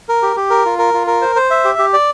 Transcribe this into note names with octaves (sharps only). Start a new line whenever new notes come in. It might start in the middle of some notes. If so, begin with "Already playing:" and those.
A#4
G4
G4
A#4
F4
A#4
F4
A#4
C5
C5
E5
G4
G4
D5